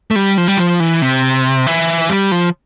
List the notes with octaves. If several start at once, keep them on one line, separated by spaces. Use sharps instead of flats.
A3
G3
F3
G3
F3
E3
C3
E3
G3
F3